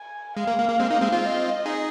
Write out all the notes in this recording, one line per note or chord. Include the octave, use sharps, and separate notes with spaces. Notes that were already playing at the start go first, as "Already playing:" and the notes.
Already playing: G#5
G#3 F5
A#3
A#3
A#3
G#3 C4
A#3 D#4
G#3 C4
C4 F4
D#5
D#4 G#4